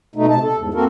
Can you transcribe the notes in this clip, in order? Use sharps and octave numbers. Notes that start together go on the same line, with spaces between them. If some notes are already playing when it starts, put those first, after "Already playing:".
B2 A3 D#4
C3 A5
A4
E2 G#2
A#3 C4 F#4 A4 A#4